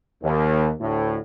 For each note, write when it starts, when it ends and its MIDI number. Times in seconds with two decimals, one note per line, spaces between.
0.23 0.71 39
0.81 1.18 38
0.81 1.18 45